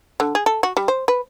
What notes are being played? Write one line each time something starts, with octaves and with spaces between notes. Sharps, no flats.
D3
G#4
A4
F#4
G3
C5
B4